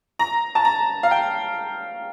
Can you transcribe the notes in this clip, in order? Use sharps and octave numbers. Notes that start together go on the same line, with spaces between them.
A#5
A5
A#5
F5
G5